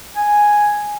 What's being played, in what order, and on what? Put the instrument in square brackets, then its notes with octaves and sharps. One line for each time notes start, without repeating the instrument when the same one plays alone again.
[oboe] G#5